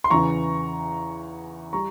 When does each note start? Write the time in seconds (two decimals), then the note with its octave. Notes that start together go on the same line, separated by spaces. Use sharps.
0.04 C6
0.10 E2 C#3 E3 A#5 C#6
1.73 G3 A#5 C#6